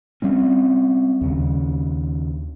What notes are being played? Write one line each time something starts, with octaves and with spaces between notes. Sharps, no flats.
G3 C4 C#4
D#2 C#3